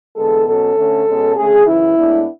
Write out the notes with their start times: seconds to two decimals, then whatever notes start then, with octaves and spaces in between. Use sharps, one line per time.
0.15 E2 D3 G#3 B3 A4
0.46 B2 F#3 C#4 A4
0.75 D3 A3 C#4
1.06 B2 G#3 C#4
1.36 D3 A3 C#4 G#4
1.65 F#2 C#3 E3 E4
1.95 A2 G#3 B3 D4